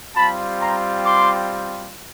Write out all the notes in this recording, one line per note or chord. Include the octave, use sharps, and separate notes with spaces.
G3 C4 F4 A5 B5
A#5 C6
C6 D6